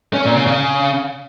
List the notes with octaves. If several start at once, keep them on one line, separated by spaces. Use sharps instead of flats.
C#4
A#2
C#3
C#3